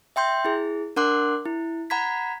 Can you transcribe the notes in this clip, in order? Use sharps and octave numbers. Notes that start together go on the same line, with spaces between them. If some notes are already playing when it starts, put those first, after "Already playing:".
E5 G5 C6 G6
E4 G#4
D4 A#4 F#5 C6 D6 F#6
E4
F#5 A#5 B5 G#6 B6